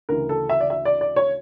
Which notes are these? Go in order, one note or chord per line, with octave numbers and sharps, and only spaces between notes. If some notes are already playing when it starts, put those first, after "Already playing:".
D2 C#3 E3 A#4
A4
E5
D5
E5
D5
D5
C#5